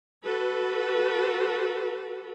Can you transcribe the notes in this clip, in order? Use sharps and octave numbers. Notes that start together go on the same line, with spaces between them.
F#4 A4 B4